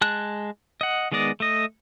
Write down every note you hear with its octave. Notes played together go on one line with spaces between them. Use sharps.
G#3 A5 F#6
D#5 F#5
D#3 G#3 B3 D5 D#5
A3 D#5